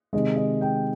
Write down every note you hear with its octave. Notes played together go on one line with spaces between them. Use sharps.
C3 D#3 G#3 D#5
D#5
G5